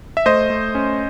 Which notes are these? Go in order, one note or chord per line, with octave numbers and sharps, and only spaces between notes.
E5
A3 C5 D#5
A3
C#4